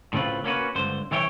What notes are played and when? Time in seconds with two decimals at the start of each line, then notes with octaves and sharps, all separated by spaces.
0.13 A2 C#3 C4 F4 B4
0.44 A#3 C#4 F#4 B4
0.75 C#2 G2 D3 C5
1.11 C2 E3 E4 C#5 G5